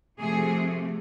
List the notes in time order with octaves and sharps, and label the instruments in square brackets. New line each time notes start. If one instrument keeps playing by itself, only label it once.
[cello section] C3 F3 A3 G#4